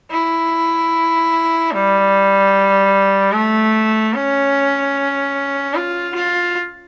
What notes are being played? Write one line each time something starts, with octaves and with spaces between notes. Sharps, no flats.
E4
G3
A3
C#4
F4
F4